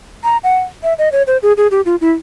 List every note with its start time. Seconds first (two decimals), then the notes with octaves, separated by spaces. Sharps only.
0.24 A#5
0.44 F#5
0.83 E5
0.98 D#5
1.12 C#5
1.27 C5
1.43 G#4
1.57 G#4
1.71 G4
1.86 F4
2.01 E4